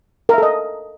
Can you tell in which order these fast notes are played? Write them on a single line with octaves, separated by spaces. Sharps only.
A#4 E5 A4 D#5